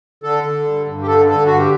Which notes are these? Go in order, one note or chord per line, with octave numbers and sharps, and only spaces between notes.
D3 A4
D3
G2
G2
G4
D3 A4
D3 A4
G2 F#4
G4